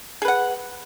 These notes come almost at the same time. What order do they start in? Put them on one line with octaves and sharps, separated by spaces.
G#4 B4 F#5